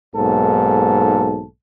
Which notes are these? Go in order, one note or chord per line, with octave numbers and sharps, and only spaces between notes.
B1 G#2 A#3 A4